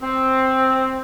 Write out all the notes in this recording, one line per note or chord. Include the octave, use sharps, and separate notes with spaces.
C4